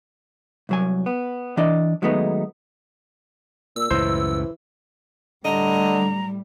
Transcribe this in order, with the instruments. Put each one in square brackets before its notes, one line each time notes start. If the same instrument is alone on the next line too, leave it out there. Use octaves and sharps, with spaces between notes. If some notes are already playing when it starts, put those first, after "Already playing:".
[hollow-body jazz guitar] C2 F#3 G#5
B3
E3 D4 D5 D#5
D#3 F#3 G#3 A3 B3 D#4
[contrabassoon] A#2 [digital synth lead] E6
[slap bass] C#2 F#2 A2 [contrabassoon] E3 [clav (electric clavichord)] C5
[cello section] A2 G3 [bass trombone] D3 [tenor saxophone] D#5 [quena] A#5